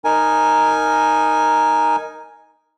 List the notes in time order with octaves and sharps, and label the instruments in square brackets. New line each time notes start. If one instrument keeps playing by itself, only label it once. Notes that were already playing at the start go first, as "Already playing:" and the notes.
[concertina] D#4 A#4 G#5